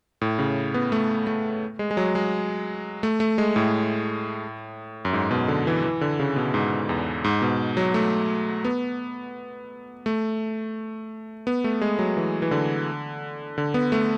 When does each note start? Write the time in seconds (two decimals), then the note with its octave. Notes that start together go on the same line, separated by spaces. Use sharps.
0.21 A2
0.39 C#3
0.74 B3
0.92 A3
1.27 A3
1.79 G#3
1.91 G#3
1.97 F#3
2.15 G#3
3.03 A3
3.20 A3
3.38 G#3
3.56 A2
5.05 F#2
5.13 G#2
5.31 B2
5.48 D3
5.67 E3
5.84 E3
6.01 D3
6.19 C#3
6.36 B2
6.54 G#2
6.89 E2
7.24 G#2
7.42 B2
7.77 F#3
7.94 A3
8.65 B3
10.06 A3
11.47 B3
11.64 A3
11.81 G#3
11.99 F#3
12.17 E3
12.42 E3
12.51 D3
13.58 D3
13.74 B3
13.92 A3